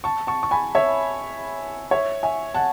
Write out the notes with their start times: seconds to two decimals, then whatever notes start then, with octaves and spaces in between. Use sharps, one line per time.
0.04 A5 C#6
0.27 A5 C#6
0.43 C#6
0.51 G#5 B5
0.75 C#5 E5
1.91 C#5 E5
2.23 E5 G#5
2.55 F#5 A5